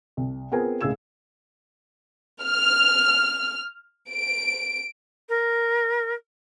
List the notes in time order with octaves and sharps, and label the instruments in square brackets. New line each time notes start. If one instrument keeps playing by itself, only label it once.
[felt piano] C2
B3 C4 F4 G#4 A#4 G#5
C#2 A2 G#4 E6 G#6 E7
[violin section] F6
D7
[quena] A#4